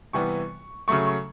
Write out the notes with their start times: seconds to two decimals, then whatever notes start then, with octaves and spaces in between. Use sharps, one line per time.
0.13 C3 E3 G3 B3 C#6
0.88 C#3 F#3 A3 C#6
1.07 C#6